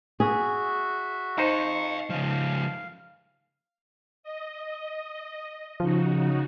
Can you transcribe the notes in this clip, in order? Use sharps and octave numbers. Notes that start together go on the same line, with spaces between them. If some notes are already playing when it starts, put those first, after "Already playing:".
F#4 G#4 E5
D#4 C5 F5 G5 C#6
C#3 F3 F5
D#5
C#3 F3 D#4 F#4